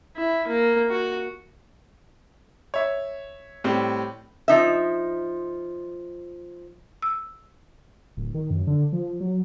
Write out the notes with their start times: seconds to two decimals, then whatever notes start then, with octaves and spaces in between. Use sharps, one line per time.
0.16 E4
0.47 A#3
0.90 F#4
2.74 C#5 E5
3.64 A2 G3 C4 G4
4.48 F3 D#4 E5
7.02 E6
8.17 D1
8.35 D#3
8.51 F#2
8.67 D3
8.93 F3
9.20 F#3